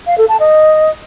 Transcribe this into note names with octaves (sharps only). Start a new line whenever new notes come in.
F5
A4
A5
D#5